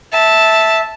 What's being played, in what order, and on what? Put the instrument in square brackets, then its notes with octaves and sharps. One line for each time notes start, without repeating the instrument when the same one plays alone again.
[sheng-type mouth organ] E5 [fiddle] A5